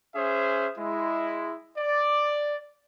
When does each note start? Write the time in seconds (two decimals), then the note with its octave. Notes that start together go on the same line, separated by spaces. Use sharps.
0.14 C#4 G#4 C5 E5
0.78 G#3 E4
1.78 D5